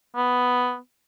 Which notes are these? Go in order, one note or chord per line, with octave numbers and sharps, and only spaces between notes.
B3